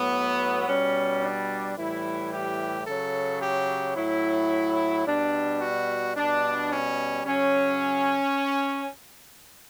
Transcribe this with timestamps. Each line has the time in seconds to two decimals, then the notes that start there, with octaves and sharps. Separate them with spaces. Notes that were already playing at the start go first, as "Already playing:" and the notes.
Already playing: A2 F#3 B3
0.67 B2 G3 C#4
1.22 D4
1.77 A2 E3 G3 E4
2.33 G4
2.87 C#3 F#3 A4
3.42 G4
3.96 A2 F#3 E4
5.06 B2 G3 D4
5.61 F#4
6.17 B2 G3 D4
6.72 C#4
7.26 C#3 F#3 C#4